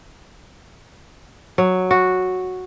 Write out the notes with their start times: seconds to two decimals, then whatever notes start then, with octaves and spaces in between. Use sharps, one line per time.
1.58 F#3
1.91 F#4